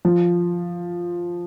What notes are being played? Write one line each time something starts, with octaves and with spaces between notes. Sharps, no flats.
F3